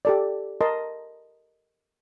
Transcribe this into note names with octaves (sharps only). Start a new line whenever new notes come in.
G4 A4 D5
A#4 D#5 A5 C6